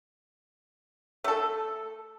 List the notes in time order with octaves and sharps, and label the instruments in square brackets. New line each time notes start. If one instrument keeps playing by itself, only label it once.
[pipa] A3 A4